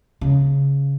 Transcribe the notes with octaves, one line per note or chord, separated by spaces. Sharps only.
C#3